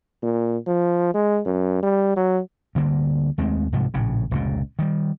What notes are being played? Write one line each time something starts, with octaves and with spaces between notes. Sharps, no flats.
A#2
F3
G#3
F#2
G3
F#3
D2 D3 G3 A#3
D#2 G#3 A3 C4
C2 G#2 C3 F3
A#1 A2 C#3
F1 C#2 A#2
D#3 G3